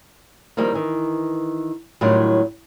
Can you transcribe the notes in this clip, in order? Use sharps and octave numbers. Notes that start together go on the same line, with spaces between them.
D#3 F3 G3 A#3 C4
D#3 E3
A2 D#3 F#3 G3 D4 F4